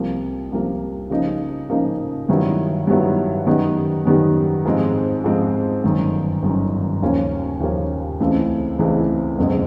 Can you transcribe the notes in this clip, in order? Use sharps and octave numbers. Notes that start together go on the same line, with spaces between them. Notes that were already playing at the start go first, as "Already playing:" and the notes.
Already playing: C2 C3 F3 A#3
C2 C3 F3 A#3
C#3 F3 A#3 D#4
C#3 F3 A#3 D#4
G2 D#3 F#3 B3 E4
G2 D#3 F#3 B3 E4
F#2 D#3 G3 B3 D#4
F#2 D#3 G3 B3 D#4
G#2 F3 G#3 C4
G#2 F3 G#3 C4
G1 F#2 D#3
G1 F#2 D#3
D#2 C#3 F3 A#3 C#4
D#2 C#3 F3 A#3 C#4
C#2 C#3 E3 A3 C4
C#2 C#3 E3 A3 C4
F#1 E2 B2 G#3 C4